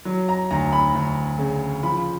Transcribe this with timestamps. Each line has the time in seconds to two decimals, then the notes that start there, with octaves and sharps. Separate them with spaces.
0.05 F#3
0.29 A#5
0.51 D2 A#5
0.73 B5
0.94 D2
1.38 C#3
1.83 F3 B5